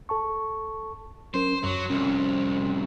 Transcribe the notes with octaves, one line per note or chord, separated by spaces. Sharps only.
A4 A5 C#6
F#3 C#4 A#4 C5
F#2 F#3
C2 F2 C#4